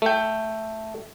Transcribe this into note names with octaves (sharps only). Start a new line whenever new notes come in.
A3 G5